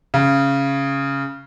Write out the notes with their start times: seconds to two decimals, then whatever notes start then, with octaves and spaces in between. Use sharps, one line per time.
0.14 C#3